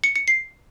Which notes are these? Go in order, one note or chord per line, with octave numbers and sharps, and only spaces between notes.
C#7
C#7
C7